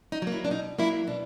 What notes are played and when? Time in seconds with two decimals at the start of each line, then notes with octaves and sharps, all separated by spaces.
0.12 D#4
0.22 F#3 A#3
0.32 E4
0.45 D4
0.50 B2 D#4
0.78 F#3 A#3 E4
1.07 B2 D4